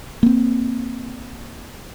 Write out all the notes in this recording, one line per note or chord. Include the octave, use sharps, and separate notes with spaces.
A#3 C4